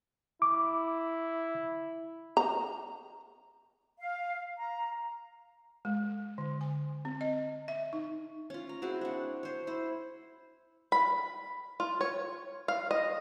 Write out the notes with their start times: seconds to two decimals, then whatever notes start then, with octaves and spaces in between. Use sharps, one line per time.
0.42 E4 D6
2.37 A#5
3.99 F5
4.58 A#5
5.85 G#3
6.38 D3
6.61 G#5
7.05 C4
7.21 D#5
7.68 E5
7.93 D#4
8.50 C#4 F4
8.69 A#5
8.82 C4 E4 F#4 G#4
9.01 D4 F#5
9.43 C5 C#5
9.67 E4 C5
10.92 B5
11.80 F4
12.01 C#5
12.68 F5
12.91 D#5